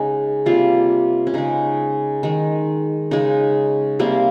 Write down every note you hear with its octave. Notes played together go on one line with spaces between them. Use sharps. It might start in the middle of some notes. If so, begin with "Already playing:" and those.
Already playing: C#3 G#3 D#4
C3 G3 A#3 F4
C#4
C#3 G#3 D#4
D#3 G#3
C#3 G#3 D#4
C3 G3 A#3